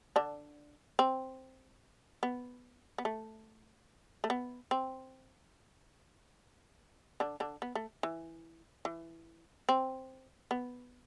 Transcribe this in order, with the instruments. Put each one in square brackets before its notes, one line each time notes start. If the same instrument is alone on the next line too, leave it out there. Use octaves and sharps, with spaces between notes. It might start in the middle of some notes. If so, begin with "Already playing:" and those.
[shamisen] D3 D4
C4
B3
B3
A3
A3
B3
C4
D3 D4
D3 D4
B3
A3
E3
E3
C4
B3